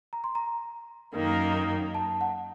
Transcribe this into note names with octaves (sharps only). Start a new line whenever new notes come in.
A#5
C6
A#5
F#2 D#3 A#3
A5
F#5